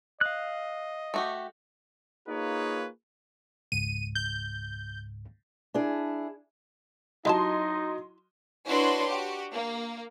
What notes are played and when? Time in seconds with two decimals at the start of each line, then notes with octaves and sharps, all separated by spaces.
0.21 D#5 F5 F#6
1.14 A3 F#4 G4
2.27 A#3 D#4 F4 G#4 B4 C#5
3.72 C#2 G#2 D#7
4.15 G6
5.74 D4 E4 G#4
7.25 F#3 D#4 E4 G4 D#5 A5 C6
8.68 D4 E4 F#4 B4 C#5 C6
9.09 F#4 G4
9.52 A#3